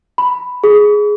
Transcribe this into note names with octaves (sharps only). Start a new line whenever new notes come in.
B5
G#4